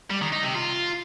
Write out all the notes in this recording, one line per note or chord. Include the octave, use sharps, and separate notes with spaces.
G3
D#3
D#4
C3
F4